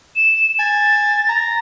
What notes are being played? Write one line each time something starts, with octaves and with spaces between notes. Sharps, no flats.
E7
G#5 A6
A#5